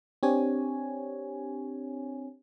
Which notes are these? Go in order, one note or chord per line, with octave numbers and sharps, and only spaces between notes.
C4 D4 G4 C#5 G#5